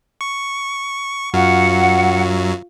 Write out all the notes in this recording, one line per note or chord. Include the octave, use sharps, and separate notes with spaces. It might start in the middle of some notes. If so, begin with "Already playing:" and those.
C#6
F#2 F#3 F4 F5 F#5 C#6